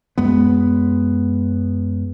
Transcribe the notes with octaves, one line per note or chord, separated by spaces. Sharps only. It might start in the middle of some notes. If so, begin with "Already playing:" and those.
F#2 G#3 B3